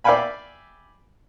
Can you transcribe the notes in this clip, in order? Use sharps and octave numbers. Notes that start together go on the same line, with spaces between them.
D5 E5 F5 G5 G#5 B5